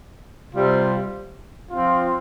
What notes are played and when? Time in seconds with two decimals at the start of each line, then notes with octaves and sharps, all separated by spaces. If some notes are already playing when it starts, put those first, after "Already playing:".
0.53 C3 G3 C4 F4
1.70 F3 C4 F4